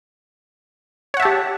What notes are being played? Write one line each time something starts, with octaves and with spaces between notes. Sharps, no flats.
G4 C#5 E5 F#5 A5